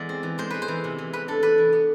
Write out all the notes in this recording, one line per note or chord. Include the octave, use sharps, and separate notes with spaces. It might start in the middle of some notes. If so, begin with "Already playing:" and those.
Already playing: E2 G#3 D5 E5
C4
E3
G#3 C5
G#3 B4
C5
E3
C3
E3
C3 B4
D4 A4
D4 B4
E3
B3